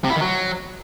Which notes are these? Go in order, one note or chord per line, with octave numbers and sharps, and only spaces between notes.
C3
E4
D#3
F#3